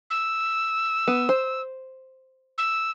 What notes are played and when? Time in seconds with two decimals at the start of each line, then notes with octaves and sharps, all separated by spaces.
0.10 E6
1.08 B3
1.29 C5
2.58 E6